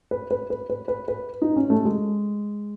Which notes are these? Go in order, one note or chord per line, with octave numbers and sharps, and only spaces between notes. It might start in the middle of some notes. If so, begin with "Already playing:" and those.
B4
B4
B4
B4
B4
B4
D#4
C#4
A3
G#3